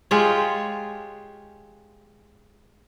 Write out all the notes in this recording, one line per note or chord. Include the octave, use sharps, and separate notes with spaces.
G#3 F4 G4 C#5